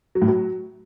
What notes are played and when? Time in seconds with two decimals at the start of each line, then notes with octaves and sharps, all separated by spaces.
0.15 F#3
0.22 A2
0.28 F#3